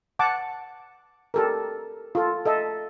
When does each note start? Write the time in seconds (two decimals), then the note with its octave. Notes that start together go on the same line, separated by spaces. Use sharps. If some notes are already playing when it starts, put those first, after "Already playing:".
0.19 F#5 A5 D6
1.34 G4 A4 A#4
2.15 F4 A4
2.45 A4 D#5 E5